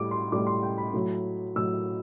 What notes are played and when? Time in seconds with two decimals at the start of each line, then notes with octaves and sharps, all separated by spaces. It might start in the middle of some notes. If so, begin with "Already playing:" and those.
Already playing: A2 G3 D6
0.11 C6
0.32 A2 G3 D6
0.47 C6
0.63 G5
0.78 B5
0.94 A2 F#3
1.56 A2 F#3 E6